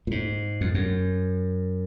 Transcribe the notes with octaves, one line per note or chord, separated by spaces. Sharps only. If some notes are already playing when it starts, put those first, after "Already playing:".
A#2
G#2
F2
F#2